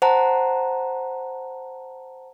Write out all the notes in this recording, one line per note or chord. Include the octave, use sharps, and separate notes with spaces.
C5 F#5 A5 A#5